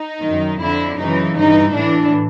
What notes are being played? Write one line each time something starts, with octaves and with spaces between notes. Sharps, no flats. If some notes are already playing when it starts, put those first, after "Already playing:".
Already playing: D#4
F#2 D#3
F2 D3 E4
F#2 C#3 E3 D#4
G2 E3 D#4
A2 E3 D4